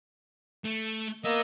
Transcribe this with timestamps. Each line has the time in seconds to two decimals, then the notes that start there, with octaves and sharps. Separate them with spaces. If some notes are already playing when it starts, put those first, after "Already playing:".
0.64 A3
1.24 A#3 B3 D#5 E6